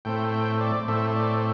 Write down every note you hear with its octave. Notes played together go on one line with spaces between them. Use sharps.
A2 A3 C4 G5
G5
D5
A2 A3 C4 E5
D5